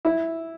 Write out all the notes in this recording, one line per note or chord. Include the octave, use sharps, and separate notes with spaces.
E4